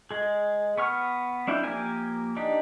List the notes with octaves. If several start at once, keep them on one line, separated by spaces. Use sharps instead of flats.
G#3 G#4
B3 C#6 F6
C4 D4 E4 F4 G5
F3 A#3 G4 A#4 G#5
D4 D#4 G4